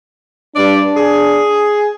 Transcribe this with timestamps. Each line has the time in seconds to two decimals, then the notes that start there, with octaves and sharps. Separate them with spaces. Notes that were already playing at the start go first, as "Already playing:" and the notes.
0.56 G2 D4 D5
0.97 G#4